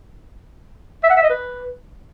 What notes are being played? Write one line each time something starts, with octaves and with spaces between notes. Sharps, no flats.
E5
F#5
E5
D#5
B4